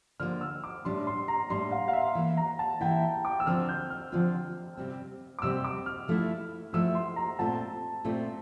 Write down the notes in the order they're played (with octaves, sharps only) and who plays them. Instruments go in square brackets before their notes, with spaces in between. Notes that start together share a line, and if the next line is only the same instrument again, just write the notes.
[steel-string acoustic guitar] D3 F3 A#3 [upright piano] F6
[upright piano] E6
D6
[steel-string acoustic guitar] A2 G3 D4 [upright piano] C6
[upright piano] C6
A#5
[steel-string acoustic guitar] A2 G3 D4 [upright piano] C6
[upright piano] F5
F5
E5
[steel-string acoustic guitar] E3 A#3 E4
[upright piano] A#5
A5
[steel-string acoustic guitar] E3 A#3 E4 [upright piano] G5
[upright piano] D6
E6
[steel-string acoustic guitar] D3 F3 C4 F4 [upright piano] F6
[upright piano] G6
F6
[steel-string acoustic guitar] D3 F3 C4 F4
C3 G3 C4
[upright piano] D6
[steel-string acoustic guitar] C3 G3 C4 [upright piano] E6
[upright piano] D6
F6
[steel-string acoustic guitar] F3 A3 E4
[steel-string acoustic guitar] F3 A3 E4 [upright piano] E6
[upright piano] C6
A#5
[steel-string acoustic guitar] A#2 A3 C4 F4 [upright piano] A5
[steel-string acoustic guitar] A#2 A3 C4 F4